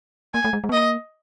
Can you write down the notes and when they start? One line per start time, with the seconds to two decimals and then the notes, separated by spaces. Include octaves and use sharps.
0.34 A#3 G#5
0.45 A3
0.53 G#3
0.64 G#3
0.69 B3
0.73 A#3 D#5